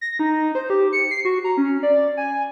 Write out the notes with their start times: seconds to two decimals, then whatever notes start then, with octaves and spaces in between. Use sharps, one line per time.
0.01 A#6
0.19 D#4
0.55 C5
0.70 G4
0.93 C#7
1.11 C7
1.25 F#4
1.44 A#5
1.57 C#4
1.83 D5
2.17 G#5